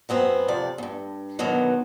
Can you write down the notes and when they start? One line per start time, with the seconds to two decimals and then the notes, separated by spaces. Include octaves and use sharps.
0.09 F#2 F#3 B3 C4
0.48 F2 C3 D5
0.78 E2 G2
1.39 B2 D3 D#3 F#3 B3